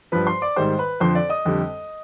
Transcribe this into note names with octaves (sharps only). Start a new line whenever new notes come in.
G2 F3 B4 B5
C5 C6
D5 D6
G#2 D#3 G3 C5 C6
B4 B5
F2 D3 F3 C5 C6
D5 D6
D#5 D#6
F2 D3 G3